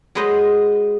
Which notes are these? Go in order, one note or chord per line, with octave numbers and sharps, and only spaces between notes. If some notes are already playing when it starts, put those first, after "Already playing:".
F#3 G#3 G#4 B4 C5 D#5